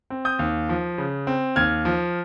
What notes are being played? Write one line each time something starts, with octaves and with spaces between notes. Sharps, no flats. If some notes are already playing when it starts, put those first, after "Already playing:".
C4
D#6 G6
D#2
F3
C#3
C4
D#2 F6 G#6
F3